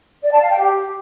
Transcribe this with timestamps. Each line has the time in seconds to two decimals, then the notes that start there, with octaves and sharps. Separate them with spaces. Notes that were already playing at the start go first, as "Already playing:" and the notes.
0.23 D5
0.32 A5
0.41 F5
0.50 G5
0.59 G4